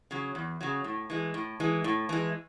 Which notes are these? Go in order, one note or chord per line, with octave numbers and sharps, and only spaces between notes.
C#3 F#3
E2
C#3 F#3
A2
E3 G#3
A2
E3 G#3
A2
E3 G#3